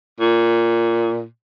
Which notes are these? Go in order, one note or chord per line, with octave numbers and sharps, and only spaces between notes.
A#2